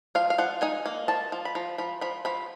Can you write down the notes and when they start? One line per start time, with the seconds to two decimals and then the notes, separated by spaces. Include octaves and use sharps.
0.15 F3 F5
0.30 F5
0.38 F3 F#5
0.62 D#4 G#5
0.86 A#3
1.08 F3 A5
1.32 F3
1.45 B5
1.55 F3 A#5
1.78 F3 B5
2.01 F3 B5
2.25 F3 B5